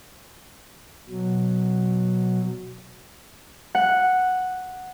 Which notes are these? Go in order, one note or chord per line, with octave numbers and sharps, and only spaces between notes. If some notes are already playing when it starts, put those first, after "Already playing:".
B2 F#3
F#5